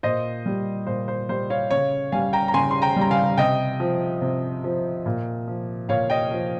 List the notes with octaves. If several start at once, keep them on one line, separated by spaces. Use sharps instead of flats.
A#2 C5 D#5
G3
A#2 C5
C5
G3 C5
C#5 F5
C#3 C#5 F5
G3 F5 G#5
G5 A#5
A#5
C#3 G#5 C6
C6
G5 A#5
G3 A#5
F5 G#5
C3 D#5 G5
F3
C3
F3
A#2
F3
A#2 C#5 F5
D#5 G5
F3